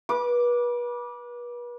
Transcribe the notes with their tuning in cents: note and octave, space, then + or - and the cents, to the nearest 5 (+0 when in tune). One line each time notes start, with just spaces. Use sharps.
B4 -35 D6 +0